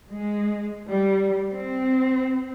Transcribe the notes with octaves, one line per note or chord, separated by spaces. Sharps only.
G#3
G3
C4